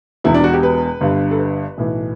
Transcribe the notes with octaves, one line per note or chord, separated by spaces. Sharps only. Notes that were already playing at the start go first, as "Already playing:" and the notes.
E1 E2 B2 E4
D4
F#4
G4
B4
G1 G2 D3
A4
B4
B1 A2 E3